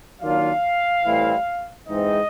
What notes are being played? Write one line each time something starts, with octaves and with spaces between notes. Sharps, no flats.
D#3 F#3 A#3 D4 F4 F5
A2 E3 G3 C4 E4
G#2 E3 G#3 C4 D#4 D#5